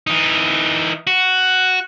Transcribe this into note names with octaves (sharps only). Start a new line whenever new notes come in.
E3 D#4
F#4